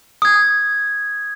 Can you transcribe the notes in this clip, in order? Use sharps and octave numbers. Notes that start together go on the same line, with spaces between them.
D#6 G#6